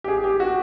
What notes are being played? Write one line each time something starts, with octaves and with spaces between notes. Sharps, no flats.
G4
G#4
G4
F#4